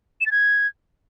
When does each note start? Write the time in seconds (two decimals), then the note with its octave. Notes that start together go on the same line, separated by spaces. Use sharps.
0.21 E7
0.26 A6
0.31 G#6